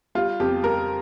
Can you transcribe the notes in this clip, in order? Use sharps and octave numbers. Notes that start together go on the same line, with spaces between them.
G3 F4
F2 G4
G3 A#4